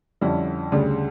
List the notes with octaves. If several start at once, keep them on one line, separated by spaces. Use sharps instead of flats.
F2 D3 G3 C#4 E4
D2 C#3 G3 D4